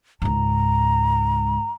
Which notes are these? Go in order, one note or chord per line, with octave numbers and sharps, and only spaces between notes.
C#2 G#2 A#5